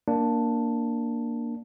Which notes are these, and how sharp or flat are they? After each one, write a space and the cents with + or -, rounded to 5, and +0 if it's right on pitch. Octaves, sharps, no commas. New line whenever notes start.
A#3 +0 D4 +0